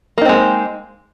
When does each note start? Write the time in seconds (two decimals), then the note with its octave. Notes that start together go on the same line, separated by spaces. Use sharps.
0.18 A#3
0.21 D#4
0.25 C4
0.29 G#3